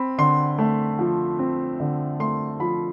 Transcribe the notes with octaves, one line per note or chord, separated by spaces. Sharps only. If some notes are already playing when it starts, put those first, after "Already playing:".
Already playing: C4 B5
D3 C6
A3
F3
C4
D3
A3 C6
F3 B5